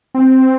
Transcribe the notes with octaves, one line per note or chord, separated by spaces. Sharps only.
C4